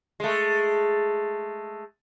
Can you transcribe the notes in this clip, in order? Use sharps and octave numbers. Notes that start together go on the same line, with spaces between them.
G#3 A3